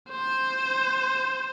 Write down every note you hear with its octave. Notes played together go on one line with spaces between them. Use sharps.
C5